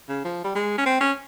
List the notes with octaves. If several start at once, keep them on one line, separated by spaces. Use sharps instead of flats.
C#3
F3
G3
G#3
C#4
C4
C#4